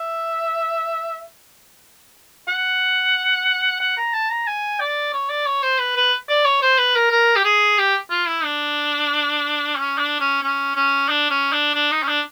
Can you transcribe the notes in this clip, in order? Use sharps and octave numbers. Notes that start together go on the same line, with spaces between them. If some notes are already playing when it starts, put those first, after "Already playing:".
Already playing: E5
F#5
F#5
A#5
A5
A#5
G#5
D5
C#5
D5
C#5
C5
B4
B4
D5
C#5
C5
B4
A#4
A#4
G4
G#4
G4
F4
E4
D4
C#4
D4
C#4
C#4
C#4
D4
C#4
D4
D4
D#4
C#4
D4